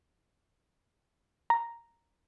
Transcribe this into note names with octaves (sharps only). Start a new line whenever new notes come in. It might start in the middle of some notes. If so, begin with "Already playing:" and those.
A#5